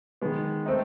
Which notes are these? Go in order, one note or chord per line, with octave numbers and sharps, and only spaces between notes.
D#3 G#3 B3
A3 C4 D#4